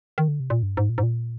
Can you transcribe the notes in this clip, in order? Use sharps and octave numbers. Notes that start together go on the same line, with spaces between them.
D#3
D3
C3
A#2
G2
G#2
A#2
G#2
A#2